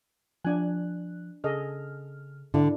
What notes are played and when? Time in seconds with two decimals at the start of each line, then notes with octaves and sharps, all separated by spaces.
0.45 F3 D4 G#5 F#6
1.44 C#3 G#4 A4 D#5 F6
2.54 G#2 D3 D4 E4